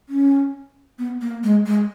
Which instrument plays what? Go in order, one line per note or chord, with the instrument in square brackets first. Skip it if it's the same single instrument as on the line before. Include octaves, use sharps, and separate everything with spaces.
[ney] C#4
B3
A#3
G#3
G#3